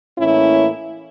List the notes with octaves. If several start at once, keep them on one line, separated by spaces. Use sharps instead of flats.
A2 E3 A#3 C#4 E4